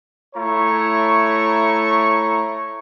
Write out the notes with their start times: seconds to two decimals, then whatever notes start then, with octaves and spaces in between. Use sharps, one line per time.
0.35 A3 E4 C#5 A#5 C#6